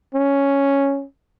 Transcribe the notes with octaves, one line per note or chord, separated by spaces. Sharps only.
C#4